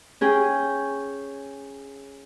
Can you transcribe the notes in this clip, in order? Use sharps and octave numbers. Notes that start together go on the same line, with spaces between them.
C#4 G#4 G5